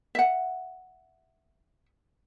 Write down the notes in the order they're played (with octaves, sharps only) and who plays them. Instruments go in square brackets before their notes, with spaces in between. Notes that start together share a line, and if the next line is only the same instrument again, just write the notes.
[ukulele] E5 F#5